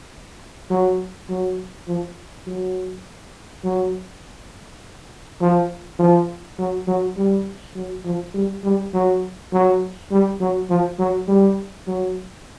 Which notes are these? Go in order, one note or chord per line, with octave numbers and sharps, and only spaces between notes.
F#3
F#3
F3
F#3
F#3
F3
F3
F#3
F#3
G3
F#3
F3
G3
G3
F#3
F#3
G3
F#3
F3
F#3
G3
F#3